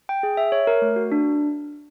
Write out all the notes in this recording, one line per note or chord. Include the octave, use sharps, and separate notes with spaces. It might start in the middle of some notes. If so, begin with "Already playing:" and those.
G5
G#4
E5
C#5
A#4
A3
F#4
D4